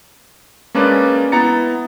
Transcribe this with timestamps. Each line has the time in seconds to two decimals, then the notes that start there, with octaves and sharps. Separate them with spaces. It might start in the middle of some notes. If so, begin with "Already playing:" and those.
0.75 G#3 A#3 C#4 D4 B4 D5
1.32 B3 E4 A#5 A6 C#7